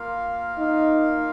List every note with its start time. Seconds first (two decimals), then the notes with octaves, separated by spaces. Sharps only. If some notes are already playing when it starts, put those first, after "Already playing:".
Already playing: A#3 F4 A#4 F5
0.58 D#4